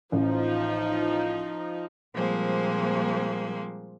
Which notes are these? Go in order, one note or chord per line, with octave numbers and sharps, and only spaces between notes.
A1 F3 D#4
A#2 F3 G3 G#3 A#3 C4